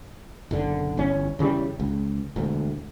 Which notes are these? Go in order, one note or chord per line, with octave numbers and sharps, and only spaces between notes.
F#1 B1 D3
G1 E2 C#4
E2 C#3 E3 G3
C#2
E1 D2